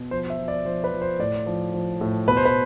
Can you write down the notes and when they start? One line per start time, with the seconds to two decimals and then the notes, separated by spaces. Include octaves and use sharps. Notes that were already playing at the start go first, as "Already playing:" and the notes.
Already playing: B2
0.11 F3 C5
0.30 E5
0.38 F3
0.48 D5
0.65 F3 C5
0.84 B4
0.92 F3
1.02 C5
1.19 A2 D5
1.46 F3
1.74 F3
2.01 A2
2.28 B2 B4
2.37 C5
2.45 B4